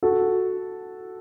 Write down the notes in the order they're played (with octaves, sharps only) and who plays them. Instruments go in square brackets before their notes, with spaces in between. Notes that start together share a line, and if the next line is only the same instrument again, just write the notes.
[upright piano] F#4 A4